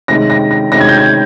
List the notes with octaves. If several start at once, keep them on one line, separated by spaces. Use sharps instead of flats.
C3 D#3 G#3 C#4 A#6
A#6
A#6
C3 D#3 G#3 C#4 A#6
G#6
G6
G#6